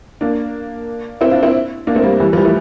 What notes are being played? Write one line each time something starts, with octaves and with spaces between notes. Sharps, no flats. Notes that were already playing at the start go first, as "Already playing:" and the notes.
A#3 D4
C4 E4
D4 F4
C4 E4
A#3 D4
A3 C4
G3 A#3
E3 G3
F3
E3 G3
F3 A3